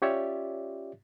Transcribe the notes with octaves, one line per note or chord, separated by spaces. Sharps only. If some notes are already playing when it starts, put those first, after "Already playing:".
C#4 F4 G4 C#5 D5 E5